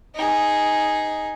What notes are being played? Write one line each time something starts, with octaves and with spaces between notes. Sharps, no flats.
D#4 G#4